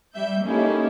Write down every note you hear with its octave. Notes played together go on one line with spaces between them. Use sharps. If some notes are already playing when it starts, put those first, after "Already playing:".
G3 E5 G6
A#3 C#4 D#4 E4 G4 A4